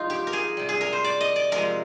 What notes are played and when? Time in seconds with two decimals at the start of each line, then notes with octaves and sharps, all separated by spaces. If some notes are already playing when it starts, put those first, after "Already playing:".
Already playing: C3 F3 G#3 D#4 F4
0.10 G4
0.27 A#4
0.33 G#4
0.57 C3 G3
0.69 G#4
0.81 A#4
0.93 C5
1.04 D5
1.21 D#5
1.36 D5
1.52 C3 F3 G#3 A#4